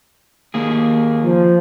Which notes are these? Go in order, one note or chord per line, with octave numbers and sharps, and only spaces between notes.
D#2 A#3 G#4
F3